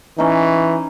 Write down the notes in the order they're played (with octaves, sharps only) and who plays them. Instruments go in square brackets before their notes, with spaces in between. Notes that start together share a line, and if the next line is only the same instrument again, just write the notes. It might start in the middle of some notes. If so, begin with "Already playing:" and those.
[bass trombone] E3 [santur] C#4 D#4